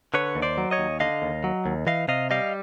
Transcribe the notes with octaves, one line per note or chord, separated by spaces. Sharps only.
D3 B4 C#5
D#2
C5 D5
F#3
C#5 D#5
D#2
D3 D#5 F5
D#2
F#3
D#2
E3 D#5 F5
C3 D#5 F5
G3 D#5 F5